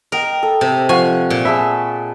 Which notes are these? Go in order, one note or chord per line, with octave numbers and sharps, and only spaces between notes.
A#4 D#5 G5
A4
C3
F3 F#5 G#5 C#6
A#2
G#4 E5 A5 B5